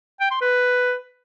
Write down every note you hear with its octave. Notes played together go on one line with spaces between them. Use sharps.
G5
C6
B4